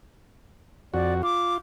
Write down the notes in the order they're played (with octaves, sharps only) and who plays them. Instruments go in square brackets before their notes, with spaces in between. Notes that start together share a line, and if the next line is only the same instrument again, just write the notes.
[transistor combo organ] F2 F#4 [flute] D5
[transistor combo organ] F4 [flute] D6